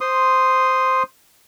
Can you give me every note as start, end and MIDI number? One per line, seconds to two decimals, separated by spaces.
0.01 1.03 72
0.01 1.03 84
0.01 1.03 87